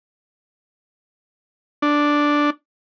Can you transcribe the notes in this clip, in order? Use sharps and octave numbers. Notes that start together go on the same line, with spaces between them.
D4